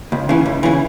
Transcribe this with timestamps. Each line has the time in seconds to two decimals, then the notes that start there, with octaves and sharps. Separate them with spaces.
0.12 C#2
0.29 C#3 E3
0.46 C#2
0.63 C#3 E3